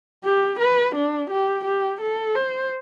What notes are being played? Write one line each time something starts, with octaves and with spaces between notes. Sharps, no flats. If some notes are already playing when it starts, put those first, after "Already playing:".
G4
B4
D4
G4
G4
A4
C5